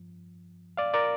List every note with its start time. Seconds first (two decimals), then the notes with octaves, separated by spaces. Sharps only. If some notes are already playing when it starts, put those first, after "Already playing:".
Already playing: G2 F3
0.77 D5 F5
0.94 A#4 D5